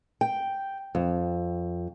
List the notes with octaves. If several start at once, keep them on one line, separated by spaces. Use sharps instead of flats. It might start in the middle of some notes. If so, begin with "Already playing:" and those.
G5
F2